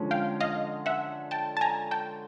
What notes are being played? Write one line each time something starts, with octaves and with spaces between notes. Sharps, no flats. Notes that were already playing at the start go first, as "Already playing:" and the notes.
Already playing: D3 F3 G#3 C#4
F5 G5
D#5 F5
E5 F#5
G5 A5
A5
G#5 A#5
G5 A5